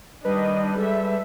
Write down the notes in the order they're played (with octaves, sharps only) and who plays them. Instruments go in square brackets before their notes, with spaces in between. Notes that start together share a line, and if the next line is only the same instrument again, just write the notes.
[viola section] D#3 D4 D#5 [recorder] G3 [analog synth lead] B4
[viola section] G#3 A4 E5